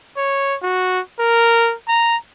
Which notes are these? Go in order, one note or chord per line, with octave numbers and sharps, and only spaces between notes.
C#5
F#4
A#4
A#5